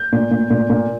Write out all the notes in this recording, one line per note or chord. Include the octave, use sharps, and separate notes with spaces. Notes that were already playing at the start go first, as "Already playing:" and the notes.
Already playing: G6
A#2
A#2
A#2
A#2